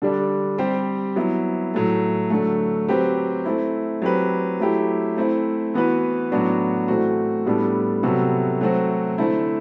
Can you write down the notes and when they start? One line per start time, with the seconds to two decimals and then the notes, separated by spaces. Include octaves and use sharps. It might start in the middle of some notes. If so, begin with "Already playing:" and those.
0.02 D3 G3 D4
0.58 G3 C4 G4 C5
1.16 F#3 B3 E4
1.74 A2 F#3 A3
2.30 D3 F#3 A3
2.88 F#3 C4 G4 B4
3.45 A3 C4 E4
4.02 F#3 C4 G4 B4
4.60 F#3 A3 E4 G4
5.17 A3 C4 E4
5.74 E3 B3 F#4 B4
6.32 A2 F#3 B3 D4 F#4
6.88 A2 E3 A3 C4 F#4
7.46 A2 G3 B3 D4 A4
8.03 C3 F#3 B3 F#4 A4
8.61 F#3 A3 C4 F#4
9.18 D3 A3 C4 E4